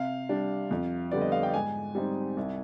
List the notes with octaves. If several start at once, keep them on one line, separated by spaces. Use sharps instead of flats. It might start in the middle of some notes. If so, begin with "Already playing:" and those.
Already playing: C3 F5
G3 D4
F2
D3 G3 B3 D5
D#5
F5
G5
G#2 G#5
G3 C4 D#4
C2